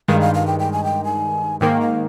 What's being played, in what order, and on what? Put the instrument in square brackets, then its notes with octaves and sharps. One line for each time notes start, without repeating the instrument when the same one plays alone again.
[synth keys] G2 D#3 G#3 [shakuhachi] F5
[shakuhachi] F5
F5
G5
G5
G#5
G5
G#5
[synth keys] G#2 D#3 A#3 [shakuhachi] G5
[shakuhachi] F5